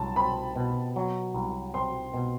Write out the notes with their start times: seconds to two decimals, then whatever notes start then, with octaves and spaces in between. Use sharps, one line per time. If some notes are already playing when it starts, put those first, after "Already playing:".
Already playing: C2 F#3 A5
0.16 C4 B5
0.56 B2
0.96 F#3
1.34 C2
1.74 C4 C6
2.14 B2